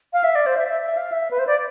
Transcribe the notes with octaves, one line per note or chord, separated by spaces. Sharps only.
F5
E5
D5
C5
E5
E5
E5
F5
E5
B4
C5
D5